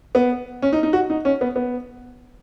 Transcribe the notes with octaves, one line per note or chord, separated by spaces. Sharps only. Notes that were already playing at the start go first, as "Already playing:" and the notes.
B3
C#4
D#4
D#4
F#4
D#4
C#4
B3
B3